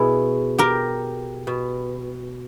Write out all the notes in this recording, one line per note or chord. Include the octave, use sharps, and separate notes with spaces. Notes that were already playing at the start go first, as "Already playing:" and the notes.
Already playing: B2 E4 G#4
G4 A#4
B2